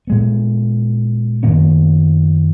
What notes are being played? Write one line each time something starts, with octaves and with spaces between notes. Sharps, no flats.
A#2 G#3 B3
F#2 D#3 A#3 C#4